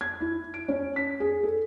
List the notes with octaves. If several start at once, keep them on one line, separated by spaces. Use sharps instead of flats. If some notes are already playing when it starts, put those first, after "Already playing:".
G#6
E4
D7
C#4
B6
G#4
A4